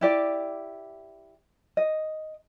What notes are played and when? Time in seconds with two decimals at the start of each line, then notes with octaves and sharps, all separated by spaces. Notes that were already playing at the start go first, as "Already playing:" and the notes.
0.01 E4 G4 D5
1.77 D#5